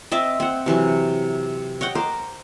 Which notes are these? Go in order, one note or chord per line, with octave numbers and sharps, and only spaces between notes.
C4 D#5 E5 D6
C4 F#5
C3 E3 F#3
C#5 D#5 F#5 G5
A#4 C5 D6